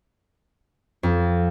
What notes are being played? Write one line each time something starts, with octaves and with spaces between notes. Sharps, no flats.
F2